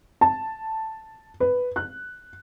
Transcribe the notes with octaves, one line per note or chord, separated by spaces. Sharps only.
A5
B4
F#6